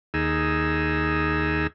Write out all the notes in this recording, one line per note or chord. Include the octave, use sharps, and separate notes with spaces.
D#2 D#4 G#4 E6